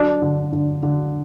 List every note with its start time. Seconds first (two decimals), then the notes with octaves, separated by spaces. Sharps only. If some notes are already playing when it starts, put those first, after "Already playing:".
Already playing: F#3 D4
0.22 D3
0.52 D3
0.83 D3